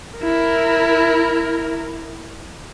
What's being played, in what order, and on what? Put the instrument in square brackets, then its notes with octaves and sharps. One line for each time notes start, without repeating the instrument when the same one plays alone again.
[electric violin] E4 A#4